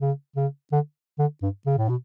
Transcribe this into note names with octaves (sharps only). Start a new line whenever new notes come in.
C#3
C#3
D3
D3
G2
C#3
A2
B2